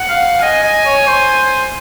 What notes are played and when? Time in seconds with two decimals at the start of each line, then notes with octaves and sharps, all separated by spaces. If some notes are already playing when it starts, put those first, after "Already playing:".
Already playing: F#5
0.09 F5
0.42 D#5 G#5
0.64 D#5
0.85 C#5
1.07 C5